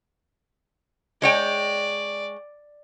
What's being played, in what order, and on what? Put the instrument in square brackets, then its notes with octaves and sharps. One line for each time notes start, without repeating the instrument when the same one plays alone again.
[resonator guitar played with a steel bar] G#3 C#5 G5 [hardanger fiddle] D5